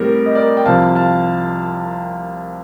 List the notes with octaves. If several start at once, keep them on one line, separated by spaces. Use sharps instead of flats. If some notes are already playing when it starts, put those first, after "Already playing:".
Already playing: A2 G3 C4 G4 A#4
D#5
A#4 D5
G5
C2 C3 F3 F5 A5
F5 A5